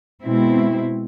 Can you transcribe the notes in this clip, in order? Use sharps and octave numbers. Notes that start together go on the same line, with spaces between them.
B2 G#3 C4 E4